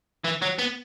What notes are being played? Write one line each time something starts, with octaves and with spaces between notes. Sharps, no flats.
E3
F#3
B3